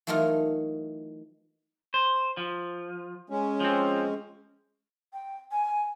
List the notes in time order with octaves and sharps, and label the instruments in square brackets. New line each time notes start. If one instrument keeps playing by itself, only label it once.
[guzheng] E3 F#3 A3 D#4 F4 A#4
[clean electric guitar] C5
F3
[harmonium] G#3 C#4
[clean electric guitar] F3 C4
[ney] G5
G#5